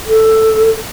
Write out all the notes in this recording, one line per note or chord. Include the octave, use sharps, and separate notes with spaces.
A4